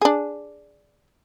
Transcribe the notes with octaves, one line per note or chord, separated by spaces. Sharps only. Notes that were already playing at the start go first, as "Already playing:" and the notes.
D4 G#4